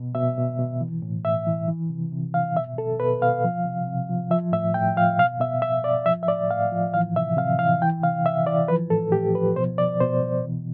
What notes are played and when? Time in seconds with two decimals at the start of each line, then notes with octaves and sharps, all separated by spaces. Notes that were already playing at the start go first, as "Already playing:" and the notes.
Already playing: B2
0.15 B2 E5
0.38 B2
0.59 B2
0.81 E3
1.02 A2
1.25 A2 E5
1.47 E3
1.68 E3
1.90 C3
2.12 C3
2.34 E3 F5
2.56 B2 E5
2.78 B2 A4
3.00 B2 B4
3.22 B2 F5
3.44 F3
3.65 C3
3.87 C3
4.10 F3
4.31 F3 E5
4.53 A2 E5
4.74 A2 G5
4.96 F3 F5
5.18 B2 F5
5.40 B2 E5
5.62 B2 E5
5.84 B2 D5
6.06 F3 E5
6.23 E5
6.28 A2 D5
6.50 A2 F5
6.72 F3
6.94 E3 F5
7.16 C3 E5
7.37 C3 F5
7.59 E3 F5
7.82 E3 G5
8.03 C3 F5
8.25 C3 E5
8.47 E3 D5
8.68 F3 B4
8.90 A2 A4
9.12 A2 G4
9.34 F3 B4
9.56 B2 C5
9.78 B2 D5
10.00 B2 C5
10.22 B2
10.44 E3